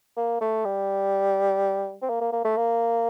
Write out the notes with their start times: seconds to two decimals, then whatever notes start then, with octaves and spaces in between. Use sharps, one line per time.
0.17 A#3
0.41 A3
0.65 G3
2.02 C4
2.09 A#3
2.21 A#3
2.32 A#3
2.45 A3
2.57 A#3